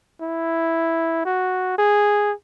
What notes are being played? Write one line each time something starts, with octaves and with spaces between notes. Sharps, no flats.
E4
F#4
G#4